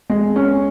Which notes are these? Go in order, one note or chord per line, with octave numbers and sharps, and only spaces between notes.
G#3
C#4